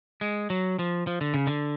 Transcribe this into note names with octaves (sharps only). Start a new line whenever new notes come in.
G#3
F#3
F3
F3
D3
C#3
D3